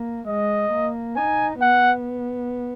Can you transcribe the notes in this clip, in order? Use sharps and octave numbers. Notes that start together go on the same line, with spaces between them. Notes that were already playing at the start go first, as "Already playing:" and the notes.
Already playing: A#3
G#3 D#5
A#3
D#4 G#5
B3 F#5